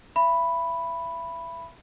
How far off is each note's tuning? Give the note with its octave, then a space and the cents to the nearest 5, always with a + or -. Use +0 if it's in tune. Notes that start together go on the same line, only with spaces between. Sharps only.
E5 +30 B5 +0